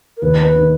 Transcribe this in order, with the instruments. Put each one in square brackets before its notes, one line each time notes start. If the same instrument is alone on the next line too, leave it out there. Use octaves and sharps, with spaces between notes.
[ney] A#4
[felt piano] D#2 [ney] B4
[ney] B4
[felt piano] D#3